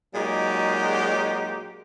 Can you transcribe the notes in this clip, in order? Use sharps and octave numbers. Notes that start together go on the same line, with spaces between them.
A#2 F#3 G#3 D#4 G4